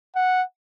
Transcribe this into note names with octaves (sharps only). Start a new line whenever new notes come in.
F#5